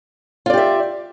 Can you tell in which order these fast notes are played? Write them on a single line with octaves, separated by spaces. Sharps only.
F4 D5 G4 E5